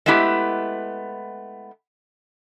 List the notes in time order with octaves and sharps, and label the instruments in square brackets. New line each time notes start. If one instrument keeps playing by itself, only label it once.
[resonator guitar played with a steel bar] G#3 A3 B3 E4 G4